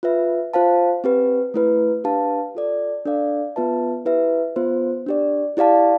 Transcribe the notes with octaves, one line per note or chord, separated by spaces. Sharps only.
F4 B4 E5
F4 C5 F5 A5
C4 G4 B4
A3 E4 B4
D4 G4 B4 F5 A5
F4 A4 D5
D4 A4 D5 F5
B3 F4 B4 E5 A5
E4 G4 B4 E5
B3 F4 C5
D4 G4 D5
E4 G4 D5 F5 A5